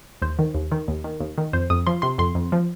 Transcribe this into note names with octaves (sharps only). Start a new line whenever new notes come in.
D#2 C5
D#3
D#2
D#3
D#2
D#3
D#2
D#3
F2 C5
F2 D#6
F3 C6
C3 C6
F2 C6
F2
F3